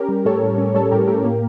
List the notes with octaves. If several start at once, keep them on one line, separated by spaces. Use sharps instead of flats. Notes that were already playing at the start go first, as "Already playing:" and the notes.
Already playing: C#4 G4 A#4
G3
A2 A4 C#5
A2
C#4
G3 A4 C#5
A2 G4 A#4
A2 G4 A#4
A#3